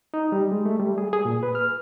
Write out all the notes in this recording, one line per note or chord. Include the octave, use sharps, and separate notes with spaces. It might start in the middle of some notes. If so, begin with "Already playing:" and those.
D#4
G3
G#3
A3
G3
G#4
G#4
A#2
B4
F6